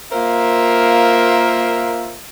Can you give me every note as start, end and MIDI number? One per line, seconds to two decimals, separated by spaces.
0.12 2.17 58
0.12 2.17 65
0.12 2.17 70
0.12 2.17 72
0.12 2.17 76